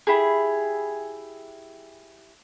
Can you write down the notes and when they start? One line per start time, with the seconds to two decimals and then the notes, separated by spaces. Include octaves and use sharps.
0.07 E4 G4 G#4